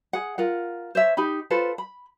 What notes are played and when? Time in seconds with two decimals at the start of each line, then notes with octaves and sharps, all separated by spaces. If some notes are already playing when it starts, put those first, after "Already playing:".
0.13 G#4 F#5
0.38 F4 A#4 F#5
0.95 C5 C#5 E5
1.17 D#4 G4 B5
1.50 F4 A4 B4 C5
1.78 B5